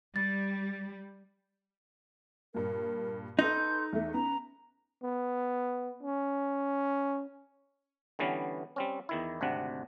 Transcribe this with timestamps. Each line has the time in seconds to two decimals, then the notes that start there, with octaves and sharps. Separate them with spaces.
0.16 G3 A6
2.54 G2 A#2 A#4
3.39 D#4 A4 B4 C6 G6
3.93 E2 A3 E5
4.14 B3 C#4 A#5
5.03 B3
6.03 C#4
8.19 D3 E3 G3 B3 C#4
8.76 G3 C4 C#4
9.09 E2 D#3 E4
9.41 G#1 D2 C3 D4 F#5